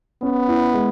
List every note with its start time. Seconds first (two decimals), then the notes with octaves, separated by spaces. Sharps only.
0.22 B3 C#4
0.48 E4
0.74 G#3